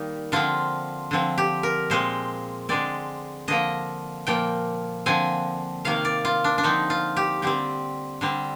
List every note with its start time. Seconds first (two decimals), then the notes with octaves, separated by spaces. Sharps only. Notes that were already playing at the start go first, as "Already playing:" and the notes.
Already playing: D#3 G3 A#3 D#4
0.32 D3 F3 C4 F4
1.11 D3 F3 C4
1.38 G4
1.63 A#4
1.90 A#2 G#3 C4 C5
2.69 D3 G#3 C4 D5
3.48 D3 F3 A#3 D#5
4.27 A#2 F3 A#3 G5
5.06 D3 F3 C4 G#5
5.85 C3 D#3 A#3 F5
6.05 D5
6.25 F4
6.44 D4
6.58 D4
6.63 D3 F3 C4 D#4
6.90 F4
7.17 G4
7.42 D3 G3 C4 G4
8.21 D3 G3 C4